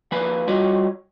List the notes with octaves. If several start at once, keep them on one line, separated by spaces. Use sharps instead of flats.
F3 A#3 B4 F5 G#5 B5
G3 F4 F#4 C#5 D#5